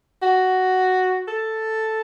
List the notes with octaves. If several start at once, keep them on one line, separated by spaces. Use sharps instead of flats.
F#4
A4